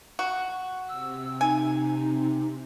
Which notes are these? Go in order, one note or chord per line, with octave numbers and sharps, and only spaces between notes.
F#4
C3 E6
D#4 G#5